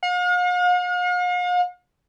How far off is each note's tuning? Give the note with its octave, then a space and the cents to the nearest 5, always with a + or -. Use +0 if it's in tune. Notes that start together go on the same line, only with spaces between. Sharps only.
F5 +45